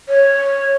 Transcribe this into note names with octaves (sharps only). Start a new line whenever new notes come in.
C#5